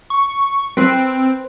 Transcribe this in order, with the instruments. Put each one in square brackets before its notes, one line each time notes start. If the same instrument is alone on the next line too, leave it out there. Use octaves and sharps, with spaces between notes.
[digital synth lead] C#6
[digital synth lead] C4 [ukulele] B4 C5